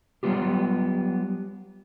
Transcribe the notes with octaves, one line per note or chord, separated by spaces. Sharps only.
F#3 G3 B3 F4 G4